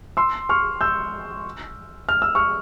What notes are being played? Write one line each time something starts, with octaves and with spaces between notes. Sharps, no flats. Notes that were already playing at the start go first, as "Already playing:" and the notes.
C6 E6
C#6 F6
E6 G6
F6
E6
C#6 F6